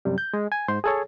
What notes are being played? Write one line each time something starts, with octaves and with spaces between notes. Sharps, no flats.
F#2 C3 G3
G6
G#3
G#5
G#2 C5 C6
G#4 A4 C#5